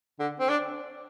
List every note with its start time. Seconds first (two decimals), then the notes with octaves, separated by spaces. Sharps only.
0.20 D3
0.40 C4
0.49 D4